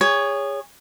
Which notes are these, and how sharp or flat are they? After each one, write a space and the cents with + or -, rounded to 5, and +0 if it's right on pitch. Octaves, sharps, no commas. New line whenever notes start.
G#4 -30 C#5 +10